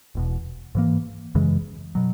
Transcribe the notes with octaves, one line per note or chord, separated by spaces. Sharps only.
E1 E2 B2
G#2 E3 A#3
F#2 C#3 E3 G#3
B2 F#3